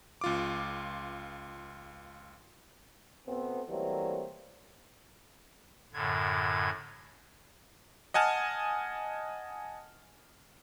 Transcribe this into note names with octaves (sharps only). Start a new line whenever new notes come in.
C#2 F4 D6
B2 A3 B3 C4
E3 F#3 G3 A3 A#3 C4
F#2 A2 D3 G#6
D#5 F#5 G#5 A5 F6